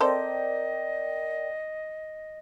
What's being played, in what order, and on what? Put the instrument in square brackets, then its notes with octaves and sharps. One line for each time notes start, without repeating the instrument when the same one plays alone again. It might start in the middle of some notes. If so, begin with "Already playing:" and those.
[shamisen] C4 A4 C5 [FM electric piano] A#4 D5 G5 [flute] D#5